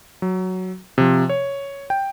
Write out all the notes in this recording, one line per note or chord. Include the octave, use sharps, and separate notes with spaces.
F#3
C3 F3
C#5
G5